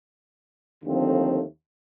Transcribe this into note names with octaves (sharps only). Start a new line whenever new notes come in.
D#2 D3 F3 A3 C4